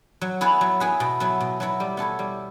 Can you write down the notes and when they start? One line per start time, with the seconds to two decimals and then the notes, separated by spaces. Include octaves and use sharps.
0.21 F#3
0.41 B3 E4 G#4 B4
0.61 F#3
0.80 B3 E4 G#4 B4
1.00 B2
1.20 F#3 B3 E4
1.40 B2
1.60 F#3 B3 E4
1.80 G3
1.97 B3 E4 A4 C#5
2.19 G3